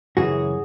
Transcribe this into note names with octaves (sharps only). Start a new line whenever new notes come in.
F#2 C#3 E3 F#4 G#4